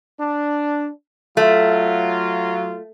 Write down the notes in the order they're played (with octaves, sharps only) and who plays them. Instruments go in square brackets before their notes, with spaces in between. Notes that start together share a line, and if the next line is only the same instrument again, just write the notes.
[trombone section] D4
[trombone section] F#3 F4 [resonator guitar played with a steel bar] A3